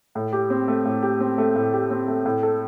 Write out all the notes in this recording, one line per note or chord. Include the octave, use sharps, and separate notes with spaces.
A2
G4
C4
A3
A2
G4
C4
A3
A2
G4
C4
A3
A2
A4